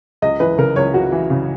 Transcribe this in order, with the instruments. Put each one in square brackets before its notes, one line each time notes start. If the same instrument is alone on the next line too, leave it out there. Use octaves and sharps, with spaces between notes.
[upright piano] C#2 D#5
E3 B4
C#3 A#4
C#2 C#5
C#2 F#4
E3
C#3